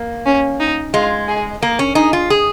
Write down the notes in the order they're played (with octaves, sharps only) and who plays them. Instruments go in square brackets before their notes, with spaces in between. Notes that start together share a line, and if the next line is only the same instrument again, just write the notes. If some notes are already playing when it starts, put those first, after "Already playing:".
Already playing: [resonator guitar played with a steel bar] A#3
[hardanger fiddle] C#4
D#4
[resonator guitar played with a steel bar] G#3 [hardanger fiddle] F4
[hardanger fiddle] G#4
[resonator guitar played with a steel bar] A#3 [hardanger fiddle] A#4
[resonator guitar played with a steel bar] C#4
[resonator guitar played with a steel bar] D#4 [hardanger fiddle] G#4
[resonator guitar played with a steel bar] F4
G#4